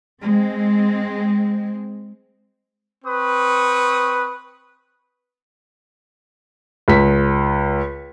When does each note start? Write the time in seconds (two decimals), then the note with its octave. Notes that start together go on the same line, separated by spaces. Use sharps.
0.23 G#3 C4
3.05 C4 B4 C#6 D#6
6.88 C#2 B6